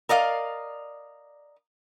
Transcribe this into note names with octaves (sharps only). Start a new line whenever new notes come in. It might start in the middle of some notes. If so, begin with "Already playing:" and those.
A#4 D5 D#5 F5